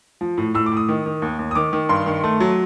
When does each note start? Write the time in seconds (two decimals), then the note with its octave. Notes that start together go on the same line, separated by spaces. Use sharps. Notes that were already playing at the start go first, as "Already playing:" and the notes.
0.21 F3
0.38 A2
0.54 A2 E6
0.66 D6
0.72 A2
0.77 D#6
0.89 D#3
1.06 D#3
1.22 D#2
1.39 D#2
1.51 D#6
1.55 D#3 D6
1.73 D#3
1.89 G2 C6
2.06 D#3
2.24 A3
2.40 F#3